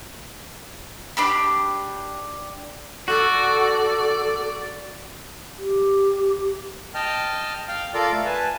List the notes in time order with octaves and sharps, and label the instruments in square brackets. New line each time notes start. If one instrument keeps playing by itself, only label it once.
[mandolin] D4 G4 B5
[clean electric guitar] F#4 [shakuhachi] A4 [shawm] D5
[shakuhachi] G4
[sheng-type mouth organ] D#5 G5 A5 F6
F5 G5 F6
F4 A4 A#4 D5 F5
A3 A4 F5
B4 G#5 A5